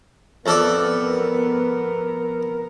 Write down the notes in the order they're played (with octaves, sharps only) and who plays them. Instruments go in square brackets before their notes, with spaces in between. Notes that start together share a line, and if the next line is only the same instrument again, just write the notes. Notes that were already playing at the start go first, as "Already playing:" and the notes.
[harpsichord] F2 A4 D5 [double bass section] B3
[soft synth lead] A#4